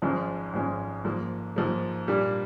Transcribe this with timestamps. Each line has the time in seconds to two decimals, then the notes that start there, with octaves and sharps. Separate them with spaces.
0.02 G#1 G#2 F3 G#3 C#4
0.53 G#1 G#2 F3 G#3 C#4
1.05 G#2 F3 A#3
1.56 G#2 F3 A#3
2.08 A#2 G3 A#3 D4